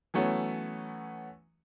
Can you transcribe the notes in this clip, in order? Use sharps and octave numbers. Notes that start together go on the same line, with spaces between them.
E3 F#3 A3 B3 C#4